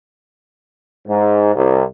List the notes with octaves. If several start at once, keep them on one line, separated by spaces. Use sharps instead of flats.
G#2
C2